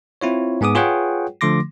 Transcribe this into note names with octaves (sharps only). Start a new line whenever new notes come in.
C4 E4 F4 C#5
G#2 B3 G#4 D6 D#6
F4 G#4 B4 C#5 F#5 G5
D3 F3 A3 C6 D6 A#6